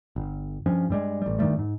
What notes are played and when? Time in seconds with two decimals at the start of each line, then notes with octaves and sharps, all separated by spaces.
0.16 G1
0.66 G2 F3 C#4
0.90 G2 G3 G#3
1.22 A1 G3
1.39 G2 D#3 G3 A3
1.59 G#2